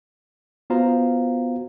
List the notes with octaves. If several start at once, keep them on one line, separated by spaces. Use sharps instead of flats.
B3 F4 F#4 C5 F5 A#5